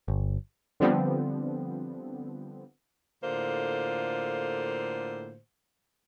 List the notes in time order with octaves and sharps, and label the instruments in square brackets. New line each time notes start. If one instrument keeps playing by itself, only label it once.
[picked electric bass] G1
[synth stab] D3 F3 G3 B3 C4
[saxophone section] A2 D3 A#3 F4 C5